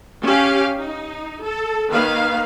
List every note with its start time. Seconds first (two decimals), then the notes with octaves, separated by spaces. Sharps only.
0.23 C#4 G4 F5
0.78 D#4
1.43 A4
1.90 D#3 A#3 B4 F5